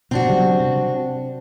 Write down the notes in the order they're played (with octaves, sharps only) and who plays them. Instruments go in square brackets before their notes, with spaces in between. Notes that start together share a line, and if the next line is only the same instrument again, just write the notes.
[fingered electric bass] B2 [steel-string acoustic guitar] C4 D4 F#4
[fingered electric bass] C#3 F#3 G3
C3